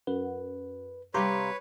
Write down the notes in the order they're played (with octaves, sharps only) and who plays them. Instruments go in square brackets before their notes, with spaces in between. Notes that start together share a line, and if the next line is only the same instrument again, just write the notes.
[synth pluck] F#2 [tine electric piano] B4
[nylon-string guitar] C3 G3 [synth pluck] G4 [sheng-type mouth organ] B4 C#5 [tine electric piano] F5 A#5 C6